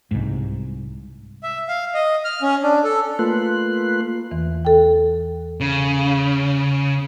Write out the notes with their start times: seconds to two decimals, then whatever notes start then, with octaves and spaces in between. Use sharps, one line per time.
0.11 C2 G#2
1.43 E5
1.68 F5
1.94 D#5
2.25 F6
2.42 C#4
2.63 D4
2.84 A4
3.19 A3 A#3 F4 B4 C6 F#6
4.31 E2 E3
4.65 A4 G5
5.61 C#3